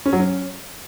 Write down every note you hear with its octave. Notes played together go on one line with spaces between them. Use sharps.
C#4
F#3
C#4